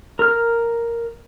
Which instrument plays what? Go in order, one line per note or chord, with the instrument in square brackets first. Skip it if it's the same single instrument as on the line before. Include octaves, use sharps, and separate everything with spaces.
[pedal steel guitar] A#4 F6